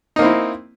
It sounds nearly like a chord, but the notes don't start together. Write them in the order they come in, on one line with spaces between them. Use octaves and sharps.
D#4 A#3 C4 E4